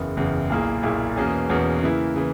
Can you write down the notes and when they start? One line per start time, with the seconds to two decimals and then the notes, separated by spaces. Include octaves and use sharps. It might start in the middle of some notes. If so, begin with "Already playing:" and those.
Already playing: F#1 E2 C#3
0.16 F#1 E2 C#3
0.50 B1 A#2 A#3 E4 G#4
0.83 B1 A#2 A#3 E4 G#4
1.16 E2 B2 A#3 C#4 G#4
1.49 E2 B2 A#3 C#4 G#4
1.83 C#3 E3 A#3 E4
2.16 C#3 E3